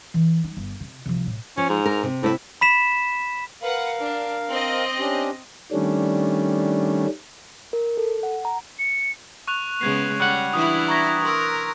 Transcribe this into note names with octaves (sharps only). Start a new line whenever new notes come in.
E3
D#4
G1
C3
C2 F3
A2
F3 C#4
G#2
A#4
C3
A2 C3 E4 E5
B5 B6 E7
A#4 B4 F5 F#5
D4
C4 D#5
C#4 D4 G4
D#3 G3 A3 C#4 D4
A#4
A4
F#5
A#5
C#7
C#6 F#6 F7
C#3 G#3 B3 G#6 C7
G3 C#4 F#5 F#6
E3 D4 E4 D#6
A#5 C#6 G#6 A#6 B6
A#4 C6 E6